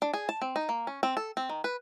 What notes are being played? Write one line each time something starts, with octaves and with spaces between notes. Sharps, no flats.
D4
G#4
A5
C4
D#4
A#3
C#4
C4
A4
C4
D#3
B4